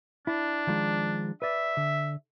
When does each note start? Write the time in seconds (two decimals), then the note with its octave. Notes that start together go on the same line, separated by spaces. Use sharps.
0.27 D4 E4
0.67 D#3 F3 G#3
1.42 B4 D5 E5
1.77 D3